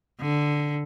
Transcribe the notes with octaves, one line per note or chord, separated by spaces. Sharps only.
D3